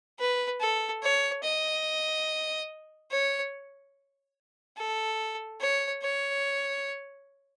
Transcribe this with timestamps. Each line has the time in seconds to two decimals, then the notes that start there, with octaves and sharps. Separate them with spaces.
0.19 B4
0.61 A4
1.03 C#5
1.44 D#5
3.11 C#5
4.77 A4
5.60 C#5
6.02 C#5